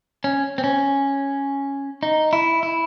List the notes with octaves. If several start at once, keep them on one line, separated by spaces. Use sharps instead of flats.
C#4
C4
C#4
D#4
E4
E4